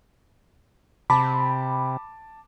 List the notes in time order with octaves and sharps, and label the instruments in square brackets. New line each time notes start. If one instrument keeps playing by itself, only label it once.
[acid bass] C3 [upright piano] A5 D6 [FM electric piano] B5